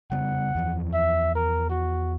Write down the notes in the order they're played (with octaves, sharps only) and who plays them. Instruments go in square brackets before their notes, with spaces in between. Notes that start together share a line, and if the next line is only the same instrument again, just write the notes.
[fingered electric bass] C#3 G3 B3 [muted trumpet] F#5
[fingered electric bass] E2 E3 F3
[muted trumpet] E5
A#4
F#4